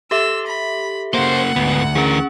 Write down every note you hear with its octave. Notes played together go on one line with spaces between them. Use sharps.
G4 A4 E5 E6
B5
C#3 A#3 C5 F#5
D2 G#2 B3
E3 C#4 G#4 A#4